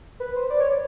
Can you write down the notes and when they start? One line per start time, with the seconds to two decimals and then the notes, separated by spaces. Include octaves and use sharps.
0.20 B4
0.36 C5
0.50 D5
0.60 C#5